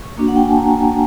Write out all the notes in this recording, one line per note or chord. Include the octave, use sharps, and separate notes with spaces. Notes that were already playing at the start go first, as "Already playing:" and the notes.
Already playing: C#6
A#3 D4 F#4
F#5
G5
G#5
A5
A#5